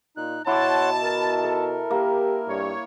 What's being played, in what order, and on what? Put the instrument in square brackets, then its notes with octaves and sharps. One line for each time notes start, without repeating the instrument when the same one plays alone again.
[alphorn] A#2 [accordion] D#4 F#6
[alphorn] B2 [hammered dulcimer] E4 D6 [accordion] C#5 F#5 C6 [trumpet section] A5
[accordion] A#4
[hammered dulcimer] A4
[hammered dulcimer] A#3 [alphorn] G4
[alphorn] G2 [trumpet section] C#5